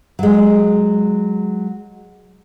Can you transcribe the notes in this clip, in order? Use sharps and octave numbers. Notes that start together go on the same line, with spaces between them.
F#3 G#3